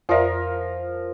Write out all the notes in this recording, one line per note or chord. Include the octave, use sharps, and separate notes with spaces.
F2 F3 A#4 D5 E5